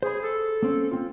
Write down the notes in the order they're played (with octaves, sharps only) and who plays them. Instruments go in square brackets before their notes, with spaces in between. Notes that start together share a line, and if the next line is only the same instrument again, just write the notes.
[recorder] G#4 [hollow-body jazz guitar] C5 B5
[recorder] A4
[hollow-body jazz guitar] A#3 C4 C#4
A#3 C4 F4